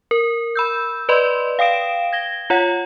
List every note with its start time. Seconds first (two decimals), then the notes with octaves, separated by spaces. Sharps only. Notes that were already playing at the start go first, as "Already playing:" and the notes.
0.11 A#4
0.56 B5 E6 G6
1.09 B4 D5 D#5 B5 C6
1.59 F5 G5 D#6 D7 E7
2.13 G#6 A#6 G7
2.50 F4 C#5 F#5